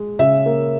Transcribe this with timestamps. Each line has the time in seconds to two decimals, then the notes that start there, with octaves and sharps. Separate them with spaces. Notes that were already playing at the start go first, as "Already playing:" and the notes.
Already playing: G#3
0.19 C#3 E5
0.46 A#3